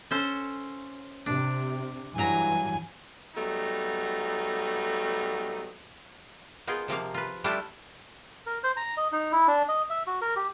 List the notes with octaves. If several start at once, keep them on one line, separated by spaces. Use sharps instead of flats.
C#4 A4 C5
C3 D4
G2 E3 F#3 G#5 A#5
F#3 G3 A3 B3 D#4
B3 D#4 F4 G#4 A#4
C3 F3 A#3 F5
F4 B4
G3 A3 D4 E4 F4
A#4
C5
A#5
D#5
D#4
E4
D4
D#5
E5
F#4
A#4
G4